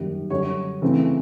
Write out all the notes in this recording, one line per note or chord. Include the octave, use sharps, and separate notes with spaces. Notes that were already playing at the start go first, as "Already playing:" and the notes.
Already playing: F#2 D#3 G3 A#3
F#2 D3 G3 C#5
C#3 E3 A3 C4